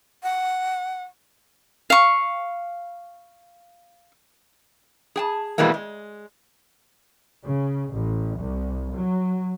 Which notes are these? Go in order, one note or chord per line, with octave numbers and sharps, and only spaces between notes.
F#5
F5 C#6
G#4 G5 A5
B2 E3 G3 G#3 A#3
G#3
C#3
A1
C2
F#3